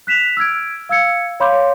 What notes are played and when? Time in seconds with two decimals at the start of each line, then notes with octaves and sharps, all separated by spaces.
0.07 F#6 B6 E7 F7
0.37 E6 F6 G#6 D7
0.89 F5 E6 G#6 C#7
1.40 C#5 F5 B5 C6 D6 G6